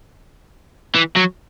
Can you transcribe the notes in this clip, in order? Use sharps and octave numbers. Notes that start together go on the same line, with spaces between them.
E3
F#3